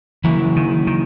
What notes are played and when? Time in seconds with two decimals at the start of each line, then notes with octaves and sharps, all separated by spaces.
0.24 C#3 E3 F#3 A#3 E4
0.56 D#3
0.87 D#3